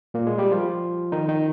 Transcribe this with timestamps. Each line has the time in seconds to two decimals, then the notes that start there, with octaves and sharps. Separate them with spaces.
0.14 A#2 A#3
0.27 G#3
0.38 G3 G4
0.52 F3 F4
1.12 D#3 D#4
1.29 D#3 D#4